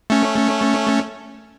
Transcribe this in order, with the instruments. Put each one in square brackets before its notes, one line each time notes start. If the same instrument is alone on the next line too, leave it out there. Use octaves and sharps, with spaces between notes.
[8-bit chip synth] A3 C#4